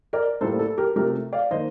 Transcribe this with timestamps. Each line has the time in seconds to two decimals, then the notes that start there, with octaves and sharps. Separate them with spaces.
0.13 A#4 D5
0.41 A2 G3 A#3 A4 C5
0.59 A4
0.78 G4 A#4
0.96 C3 F3 A3 C4 G4 A#4
1.33 D5 F5
1.51 D#3 A#3 C5 D#5